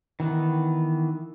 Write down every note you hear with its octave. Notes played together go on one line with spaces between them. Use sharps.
D#3 E3 B3